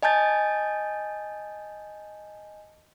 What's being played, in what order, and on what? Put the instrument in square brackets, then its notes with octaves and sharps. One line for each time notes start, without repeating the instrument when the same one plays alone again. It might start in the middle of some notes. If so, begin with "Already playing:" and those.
[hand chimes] D#5 G#5 A5 G6 A6